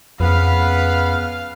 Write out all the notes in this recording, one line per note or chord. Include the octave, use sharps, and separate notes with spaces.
F2 C#3 B3 B4 F5 F6